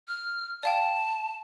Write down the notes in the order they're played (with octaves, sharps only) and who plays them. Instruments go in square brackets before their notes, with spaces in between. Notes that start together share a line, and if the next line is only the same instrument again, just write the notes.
[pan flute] F6
[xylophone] D5 F5 G5 [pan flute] A5